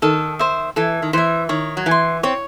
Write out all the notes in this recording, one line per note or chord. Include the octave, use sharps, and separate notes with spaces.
D#3 A4
C5 E5
E3 A4
D#3
E3 C5 E5
D#3 C#5
F#3
E3 G#5
C6
C4 C#5